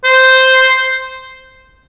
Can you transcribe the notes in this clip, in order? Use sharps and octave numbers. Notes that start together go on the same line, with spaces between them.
C5